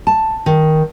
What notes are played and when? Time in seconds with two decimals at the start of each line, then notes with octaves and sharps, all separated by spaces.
0.07 A5
0.46 D#3